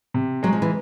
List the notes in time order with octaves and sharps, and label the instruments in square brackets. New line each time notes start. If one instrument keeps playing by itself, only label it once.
[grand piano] C3
[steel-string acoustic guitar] F#3 [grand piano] G#3
[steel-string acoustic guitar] F3
E3